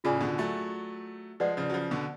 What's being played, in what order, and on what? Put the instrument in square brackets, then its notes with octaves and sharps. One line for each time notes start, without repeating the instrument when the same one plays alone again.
[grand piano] A2 C#3 [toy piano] F4 G#4 D5 G#5
[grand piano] B2 D3
F#3 A3
[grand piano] F3 G#3 [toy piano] B4 D5 F#5
[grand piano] C#3 F3
F#3
C#3 F3
B2 D3